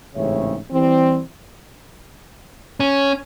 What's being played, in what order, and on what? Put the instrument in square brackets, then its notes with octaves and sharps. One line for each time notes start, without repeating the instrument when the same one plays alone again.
[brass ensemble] A1 G#2 C#3 C4 C#5 E5
E3 G3 C4
[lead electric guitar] C#4